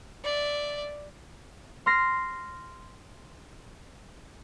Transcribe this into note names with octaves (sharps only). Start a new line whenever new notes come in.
D5 E5
C6 F6 A#6 C7